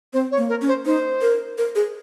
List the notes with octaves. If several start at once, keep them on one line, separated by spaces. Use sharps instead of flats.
C4 C5
C#5
A#3
A#4
C#4
C5
D#4 C5
A#4
A#4
G#4